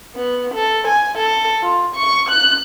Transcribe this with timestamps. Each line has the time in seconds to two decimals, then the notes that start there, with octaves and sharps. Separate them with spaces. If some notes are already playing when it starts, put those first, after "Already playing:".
0.16 B3
0.54 A4
0.87 G#5
1.18 A4
1.62 F4
1.95 C#6
2.29 F#6